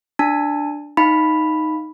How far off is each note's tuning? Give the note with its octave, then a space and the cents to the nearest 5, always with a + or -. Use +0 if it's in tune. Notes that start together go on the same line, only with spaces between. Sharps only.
D4 +0 A5 +20
D#4 +0 F5 +0 B5 +0